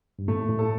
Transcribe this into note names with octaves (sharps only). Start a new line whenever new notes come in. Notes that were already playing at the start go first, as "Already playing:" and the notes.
G2
A2 A3
A2
A4